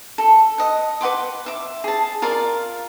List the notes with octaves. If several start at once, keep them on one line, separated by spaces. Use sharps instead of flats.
A4
D#5 F#5
B4 F#5 C6 D6
E5 D6
G#4 A5
F4 A#4 D5 F5